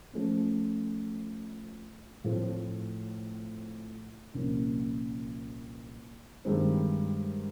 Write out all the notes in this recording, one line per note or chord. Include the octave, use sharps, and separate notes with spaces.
F3 A3 C#4
A2 F3 A3 C4 F4
C2 A#2 F3 A#3 C#4
G2 D#3 G#3 C4